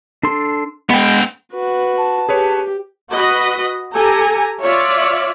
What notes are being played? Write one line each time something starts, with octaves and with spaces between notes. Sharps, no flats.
D4 A4 C6
G#3 B3 G5
F#4 B4
A5
G4 G#4 B4 C#5
F#4 B4 D#5
G4 A4 G#5 A#5
F4 C#5 D5 E5